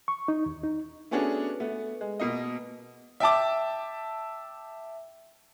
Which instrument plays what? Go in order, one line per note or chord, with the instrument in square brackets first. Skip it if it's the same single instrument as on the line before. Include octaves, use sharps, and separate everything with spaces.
[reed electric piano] C#6
D#4
D#2
D#4
[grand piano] A3 B3 C#4 D4 F#4 G#4
A3 B3
G#3
B2 A#3 D#5
[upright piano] E5 G5 A5 D6